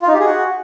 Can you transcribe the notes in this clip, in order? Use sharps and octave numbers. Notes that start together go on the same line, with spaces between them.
F4
D#4
G4
G#4
F#4